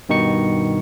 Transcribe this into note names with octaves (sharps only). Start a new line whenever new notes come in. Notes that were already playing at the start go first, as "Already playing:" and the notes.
G2 B2 D#3 D#4 C#6 C#7